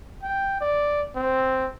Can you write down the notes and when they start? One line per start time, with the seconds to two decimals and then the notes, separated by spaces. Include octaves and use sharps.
0.23 G5
0.61 D5
1.16 C4